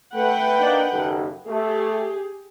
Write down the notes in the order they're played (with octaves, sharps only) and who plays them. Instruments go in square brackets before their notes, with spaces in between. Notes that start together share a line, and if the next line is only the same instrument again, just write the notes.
[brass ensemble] A3 [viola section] B4 F#5 G5
[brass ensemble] A#3 D4 D#4
F#1 D#2 A4
[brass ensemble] A3 [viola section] G4 G#4